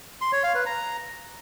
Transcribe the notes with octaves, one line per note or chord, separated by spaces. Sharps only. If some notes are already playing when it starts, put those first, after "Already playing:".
C6
C#5
F5
B4
A#5